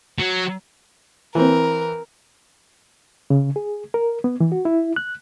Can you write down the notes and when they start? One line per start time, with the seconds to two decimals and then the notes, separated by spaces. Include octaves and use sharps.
0.18 F#3
1.35 E3 C4 A#4
3.30 C#3
3.56 G#4
3.94 A#4
4.24 B3
4.40 E3
4.52 F#4
4.65 E4
4.96 F#6